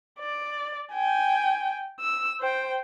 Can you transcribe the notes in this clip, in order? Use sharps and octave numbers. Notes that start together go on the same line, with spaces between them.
D5
G5 G#5
E6
C5 G5